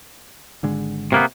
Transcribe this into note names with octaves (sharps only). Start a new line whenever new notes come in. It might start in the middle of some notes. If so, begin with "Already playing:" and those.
G#1 D3 G#3
C3 A#3 B3